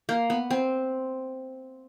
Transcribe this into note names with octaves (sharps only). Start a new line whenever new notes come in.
A#3
B3
C4